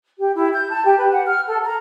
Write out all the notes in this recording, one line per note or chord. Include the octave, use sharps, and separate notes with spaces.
G4
E4
G6
A5
G4
B4
F#5
F6
A4
A#5